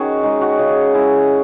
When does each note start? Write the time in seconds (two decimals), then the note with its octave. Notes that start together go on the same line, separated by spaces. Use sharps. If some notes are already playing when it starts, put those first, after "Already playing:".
Already playing: D#3 C#4 F#4 G#4
0.23 G#3 D#4
0.41 F#4
0.59 C#3 G#4
0.94 G#3 E4